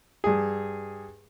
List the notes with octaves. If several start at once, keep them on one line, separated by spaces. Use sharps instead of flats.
G2 G#4